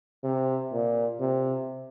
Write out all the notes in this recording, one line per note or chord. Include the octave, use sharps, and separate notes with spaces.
C3
A#2
C3